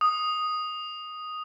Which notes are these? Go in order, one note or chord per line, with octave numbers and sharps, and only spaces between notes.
D#6